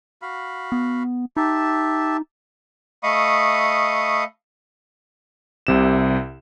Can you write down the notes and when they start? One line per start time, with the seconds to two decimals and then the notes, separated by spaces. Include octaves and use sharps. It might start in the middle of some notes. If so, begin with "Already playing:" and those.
0.22 F#4 F5 B5
0.72 B3
1.37 D#4 G4 E5 A5
3.03 A3 D#5 F5 B5 C#6 D#6
5.67 C2 C3 E7